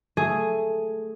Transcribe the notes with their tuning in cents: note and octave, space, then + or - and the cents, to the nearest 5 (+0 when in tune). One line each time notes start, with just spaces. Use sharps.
A3 +0 G#4 +0